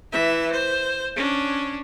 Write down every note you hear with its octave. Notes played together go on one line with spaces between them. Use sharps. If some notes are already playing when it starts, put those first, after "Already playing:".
E3 E5
C5
C#4 D4